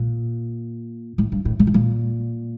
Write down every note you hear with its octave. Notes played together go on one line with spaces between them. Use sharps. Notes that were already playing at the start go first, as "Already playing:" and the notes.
Already playing: A#2
A2
G2
A2
A#2
A2
A#2